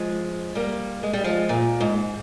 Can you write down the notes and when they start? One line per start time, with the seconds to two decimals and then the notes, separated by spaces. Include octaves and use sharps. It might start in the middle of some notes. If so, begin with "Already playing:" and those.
Already playing: F3 G#3
0.55 G3 A#3
1.03 G#3
1.13 G3
1.24 F3 G#3
1.49 A#2
1.80 G#2